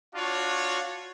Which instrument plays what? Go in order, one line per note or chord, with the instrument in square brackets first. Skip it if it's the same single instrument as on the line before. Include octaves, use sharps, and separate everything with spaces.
[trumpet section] D4 F#4 C#5 [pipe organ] F4